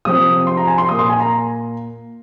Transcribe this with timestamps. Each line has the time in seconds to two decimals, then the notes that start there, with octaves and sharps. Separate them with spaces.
0.05 C3 F3 C4 D#6
0.47 C6
0.57 A#5
0.68 G#5
0.78 C6
0.89 A#2 A#3 D#6
0.99 C6
1.10 G#5
1.20 A#5